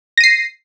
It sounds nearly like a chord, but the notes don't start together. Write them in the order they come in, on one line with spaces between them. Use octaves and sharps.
A#6 D#7 C7